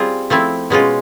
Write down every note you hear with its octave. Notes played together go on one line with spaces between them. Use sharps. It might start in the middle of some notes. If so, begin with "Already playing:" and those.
Already playing: G3 C4 F4 G#4
F3 A3 C4 E4
B2 G#3 C#4 F4